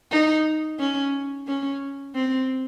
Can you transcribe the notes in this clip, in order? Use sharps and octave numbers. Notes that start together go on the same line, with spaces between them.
D#4
C#4
C#4
C4